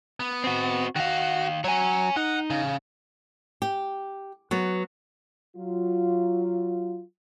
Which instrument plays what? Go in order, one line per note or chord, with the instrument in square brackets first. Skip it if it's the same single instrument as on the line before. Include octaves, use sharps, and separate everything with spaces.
[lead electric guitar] B3
[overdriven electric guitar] C4 F#4
[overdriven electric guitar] D#3 F5 [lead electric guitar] F#4
[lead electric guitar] F#3 [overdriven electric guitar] C#5 G#5
[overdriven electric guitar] D#4 [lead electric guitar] F#5
[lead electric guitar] C#3
[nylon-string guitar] G4
F#3 B3
[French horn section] F#3 F4